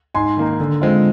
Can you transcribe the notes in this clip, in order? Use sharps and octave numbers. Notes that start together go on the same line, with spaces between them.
G#2 G#5 C6
D#3 A#3 D#4
D3
G#3 C4 F4